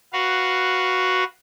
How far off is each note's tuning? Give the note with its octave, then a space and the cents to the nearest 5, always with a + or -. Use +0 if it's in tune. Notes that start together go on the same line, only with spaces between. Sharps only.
F#4 +0 B4 +0 F5 +0